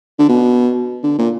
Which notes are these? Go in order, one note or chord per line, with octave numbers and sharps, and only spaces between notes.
D3
B2
D3
A#2